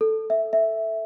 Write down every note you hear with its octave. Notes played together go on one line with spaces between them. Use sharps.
A4
E5
E5